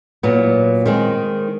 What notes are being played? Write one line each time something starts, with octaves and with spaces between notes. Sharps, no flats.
A#2 F#3 B3
D#3 G#3 C4